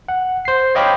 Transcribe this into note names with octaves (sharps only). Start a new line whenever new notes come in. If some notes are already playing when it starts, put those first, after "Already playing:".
F#5
C5 C7
C#5 D#5 F5 G5 B5 D6